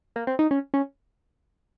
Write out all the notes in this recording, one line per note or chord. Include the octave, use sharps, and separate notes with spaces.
A#3
C4
D#4
C#4
C#4